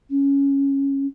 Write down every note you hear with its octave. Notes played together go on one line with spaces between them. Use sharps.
C#4